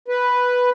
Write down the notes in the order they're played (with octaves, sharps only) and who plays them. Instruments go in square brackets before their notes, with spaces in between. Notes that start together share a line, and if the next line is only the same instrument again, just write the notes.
[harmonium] B4